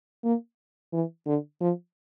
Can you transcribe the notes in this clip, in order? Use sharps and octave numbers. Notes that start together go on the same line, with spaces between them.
A#3
E3
D3
F3